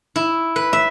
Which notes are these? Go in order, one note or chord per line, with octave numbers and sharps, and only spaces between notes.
E4
B4
E5